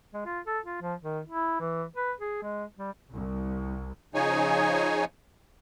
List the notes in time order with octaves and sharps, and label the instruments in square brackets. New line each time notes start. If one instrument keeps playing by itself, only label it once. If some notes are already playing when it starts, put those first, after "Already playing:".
[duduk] G#3
F4
A4
F4
F3
D#3
E4
E3
B4
G#4
G#3
G3
[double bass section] C2
[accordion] C#3 F3 D#4 G#4 C#5 G#5